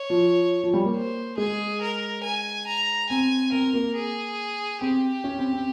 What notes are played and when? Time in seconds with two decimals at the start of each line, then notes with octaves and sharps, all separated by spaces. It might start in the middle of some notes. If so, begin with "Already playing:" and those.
Already playing: C#5
0.10 F3
0.63 F3
0.73 G3
0.85 A#3
0.96 C5
1.37 G#3 G#4
1.81 A#4
2.23 G#5
2.67 A#5
3.10 C4 G#5
3.52 C4 A#4
3.73 A#3
3.95 G#4
4.81 C4 G4
5.24 C#4
5.38 C4
5.53 C4